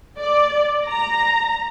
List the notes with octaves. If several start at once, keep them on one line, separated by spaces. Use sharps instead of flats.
D5
A#5